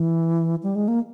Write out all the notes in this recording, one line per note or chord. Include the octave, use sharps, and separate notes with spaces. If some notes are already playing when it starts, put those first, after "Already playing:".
Already playing: E3
G3
G#3
A#3